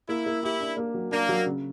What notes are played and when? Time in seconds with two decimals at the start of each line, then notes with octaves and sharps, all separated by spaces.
0.08 A#3 E4
0.26 A#3
0.43 E4 G4
0.60 D4
0.77 A#3
0.94 F#3
1.11 A#3 D4
1.29 F#3
1.46 C#3